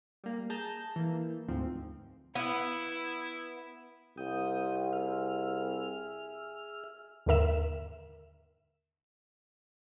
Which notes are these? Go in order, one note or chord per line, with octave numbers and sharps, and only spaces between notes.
G3 A#3
G#4 A5 A#5 G6
E3 A#3
D2 G#2 F3 C4
B3 E4
C2 G5 D#6
G#4 E5 F6
D#2 G#2 D3 A#4 E5 E7